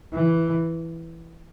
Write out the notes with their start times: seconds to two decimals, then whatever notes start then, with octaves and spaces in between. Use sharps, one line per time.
0.13 E3